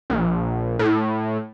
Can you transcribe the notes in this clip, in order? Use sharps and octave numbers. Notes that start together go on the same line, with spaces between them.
A#1
A2